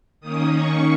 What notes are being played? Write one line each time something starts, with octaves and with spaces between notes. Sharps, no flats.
D#3 A#3 C#4 D#6
C#6